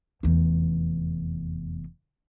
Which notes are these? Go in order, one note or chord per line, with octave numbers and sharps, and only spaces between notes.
F1 E2